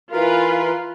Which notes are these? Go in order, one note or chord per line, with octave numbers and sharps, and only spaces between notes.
E3 F4 A#4 B4 F5